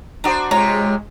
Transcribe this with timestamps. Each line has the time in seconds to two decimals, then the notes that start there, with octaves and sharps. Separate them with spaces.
0.24 D4 F#4 C5 A#5 D#6
0.51 C3 G#3 F4 C#5 A#5